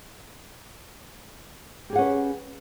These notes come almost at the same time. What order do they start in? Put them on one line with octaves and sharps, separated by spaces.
G4 G#4 F#5 C#4 B4